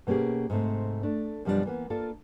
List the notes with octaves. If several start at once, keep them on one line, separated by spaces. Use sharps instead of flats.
B2 A#3 C#4 G4 G#4
G#2 C3 A3 C4
A3 D4
F#2 B2 F3 G3 B3 D4
E3 A#3 B3
A#3 D4 F4 A4